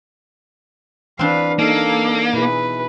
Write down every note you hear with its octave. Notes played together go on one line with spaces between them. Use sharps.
E3 C4 D4 B4 F5
A#3 D#4 A4 F5
B2 E4 G#4 B4